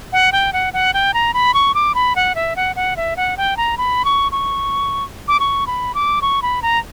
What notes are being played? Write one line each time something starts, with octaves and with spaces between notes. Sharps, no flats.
F#5
G5
F#5
F#5
G5
A#5
B5
C#6
D6
B5
F#5
E5
F#5
F#5
E5
F#5
G5
A#5
B5
C#6
C#6
D6
C#6
B5
D6
C#6
B5
A#5